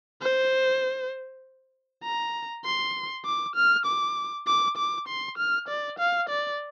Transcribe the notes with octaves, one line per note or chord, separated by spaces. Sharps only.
C5
A#5
C6
D6
F6
D6
D6
D6
C6
F6
D5
F5
D5